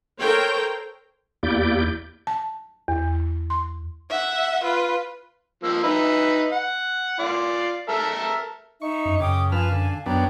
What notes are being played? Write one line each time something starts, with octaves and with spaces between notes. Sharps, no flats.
A4 A#4 C5 C#5 G5
E2 A#3 E4 G4 D5 G6
A5
E2
C6
E5 F#5
F4 B4
F3 A#3 E6
D#4 B4 E5
F#5
F4 D5
A4 A#4 E5
D#4 E5 C#6
F#2
F#2 C#3 G5 D6 D#6
F3 B4 F5 G#5 A5 F6
D3
F#2 B3 D4 C#5 G5 A#5